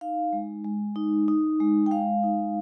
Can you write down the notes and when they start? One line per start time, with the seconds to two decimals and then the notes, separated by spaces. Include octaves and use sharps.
0.01 D#4 F5
0.33 G#3
0.64 G#3
0.96 D#4
1.28 D#4
1.60 G#3
1.86 G5
1.91 G#3 F5
2.23 D#4